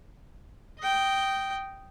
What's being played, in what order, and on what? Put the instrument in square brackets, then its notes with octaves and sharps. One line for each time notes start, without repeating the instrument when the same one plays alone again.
[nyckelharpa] D#5 G5